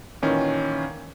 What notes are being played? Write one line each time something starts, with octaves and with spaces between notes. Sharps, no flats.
A#2 D#3 E3 C#4